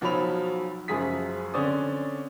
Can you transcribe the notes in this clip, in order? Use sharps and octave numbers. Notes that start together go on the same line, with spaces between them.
B1 F3 F#3 C#5 B5 F7
F#1 F#2 F3 G#4 D#6 B6
D3 C4 C#4 C5 D5 D#6